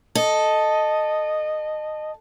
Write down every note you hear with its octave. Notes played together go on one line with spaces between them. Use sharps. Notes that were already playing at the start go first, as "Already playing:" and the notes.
A4 D#5